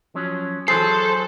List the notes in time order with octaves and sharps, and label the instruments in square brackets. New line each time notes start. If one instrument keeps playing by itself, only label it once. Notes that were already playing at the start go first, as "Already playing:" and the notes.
[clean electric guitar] F3 F#3 C#4
[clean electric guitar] E3 F#3 G#4 [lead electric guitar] A4 [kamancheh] C5 [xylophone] C7